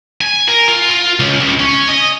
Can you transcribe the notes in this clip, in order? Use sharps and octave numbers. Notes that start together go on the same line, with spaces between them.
G#5
A#4
F4
F4
C#2
C#2
C#4
D#5